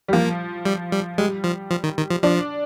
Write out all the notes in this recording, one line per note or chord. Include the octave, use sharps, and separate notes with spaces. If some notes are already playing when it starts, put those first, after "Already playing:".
G3
F3 A#3
G3
G3
G3 G#3
F3
F3
D#3
D#3
F3
F3 D4